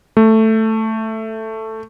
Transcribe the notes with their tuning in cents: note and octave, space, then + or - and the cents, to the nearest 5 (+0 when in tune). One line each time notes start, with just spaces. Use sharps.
A3 +5